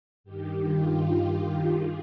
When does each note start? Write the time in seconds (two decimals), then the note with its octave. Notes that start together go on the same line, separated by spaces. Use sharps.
0.24 G2 D#3 G4
0.61 F4
0.99 G4
1.72 G#4